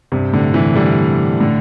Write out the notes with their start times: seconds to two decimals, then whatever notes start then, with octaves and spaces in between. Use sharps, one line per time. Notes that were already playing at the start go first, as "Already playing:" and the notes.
0.12 G2 C3
0.33 A2 D3
0.54 C3 E3
0.76 D3 G3
1.40 A2 D3